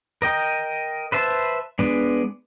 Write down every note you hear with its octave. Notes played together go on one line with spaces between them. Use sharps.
A#4 D#5 G5
B4 C5 E5 A5
G#3 B3 D4